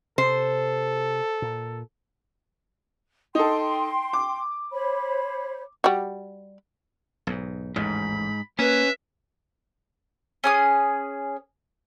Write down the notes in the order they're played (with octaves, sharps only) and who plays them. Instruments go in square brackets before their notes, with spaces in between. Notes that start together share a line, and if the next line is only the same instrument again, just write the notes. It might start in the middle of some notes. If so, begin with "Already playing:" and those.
[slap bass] C3 [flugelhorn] A4 [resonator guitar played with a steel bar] C5
[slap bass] A#2
[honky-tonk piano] D#4 A4 [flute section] G5 C6
[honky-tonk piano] D6
[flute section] C5 C#5 B5
[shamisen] G3 F#4
[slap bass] B1 G#2
[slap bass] A1 D#2 [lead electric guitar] G#2 [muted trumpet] B5
[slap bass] A#3 [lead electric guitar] C#4 [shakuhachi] B4 [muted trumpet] E5
[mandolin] C#4 G#4 D#6